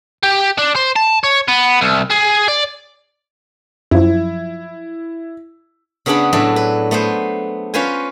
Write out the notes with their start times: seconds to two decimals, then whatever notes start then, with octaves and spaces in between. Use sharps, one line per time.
0.23 G4
0.58 D4
0.75 C5
0.96 A5
1.24 C#5
1.48 B3
1.81 C2
2.10 G#4
2.48 D5
3.91 F#2 F3 E4
6.06 C#3 B3 D4 G#4 F#5 B5
6.33 A2 F#3 D4 A4 E5
6.56 B4
6.91 A3 B3 B4 C5
7.74 C#4 F4 B4 C5 G#5